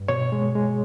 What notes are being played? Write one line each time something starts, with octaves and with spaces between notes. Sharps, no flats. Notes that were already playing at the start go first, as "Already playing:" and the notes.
Already playing: G2
B2 C#5
G#3
G#3